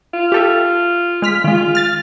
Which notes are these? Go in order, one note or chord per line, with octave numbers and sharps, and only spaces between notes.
F4
G4 A4 E5
G#3 F6 B6
D#3 G#3 F4
F6 A6